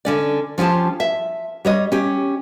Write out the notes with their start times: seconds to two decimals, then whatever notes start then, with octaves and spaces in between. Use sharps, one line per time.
0.05 D3 C#4 D5
0.58 F3 C#4 F4 G4 A5
1.00 E5
1.65 G3 C#5 D#5
1.92 C#4 G4